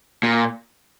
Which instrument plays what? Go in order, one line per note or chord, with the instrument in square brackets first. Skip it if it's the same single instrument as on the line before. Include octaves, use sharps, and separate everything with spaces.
[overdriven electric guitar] A#2